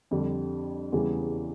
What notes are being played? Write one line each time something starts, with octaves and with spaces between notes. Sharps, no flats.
F2 D3 G3
E2 C#3 E3 G3